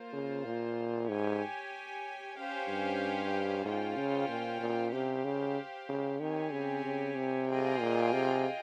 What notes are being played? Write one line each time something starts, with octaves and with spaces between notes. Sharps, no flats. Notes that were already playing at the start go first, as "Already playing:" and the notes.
Already playing: A#3 F4 C5
C#3
A#2
G#2 G4 C#5 G#5
C#4 G4 C5 F5
G2
G#2 C#4 F4 C5 G5
C#3
A#2
A#2
C3 G4 C5 F5
C#3
C#3
D#3 C4 G4 C#5 G#5
C#3
C#3
C3
F4 G#4 D#5 G5
A#2
C3